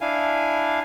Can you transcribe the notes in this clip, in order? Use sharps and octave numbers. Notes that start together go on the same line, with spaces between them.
D4 E4 F5 G#5